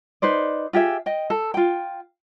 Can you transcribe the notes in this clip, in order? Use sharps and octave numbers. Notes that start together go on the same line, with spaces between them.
D#4 B4 C5 D5
F4 G4 G#4 E5
D#5 G5
A4
F4 G5